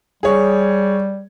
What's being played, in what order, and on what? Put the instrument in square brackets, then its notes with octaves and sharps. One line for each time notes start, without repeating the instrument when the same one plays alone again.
[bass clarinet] G3 [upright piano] G#4 C#5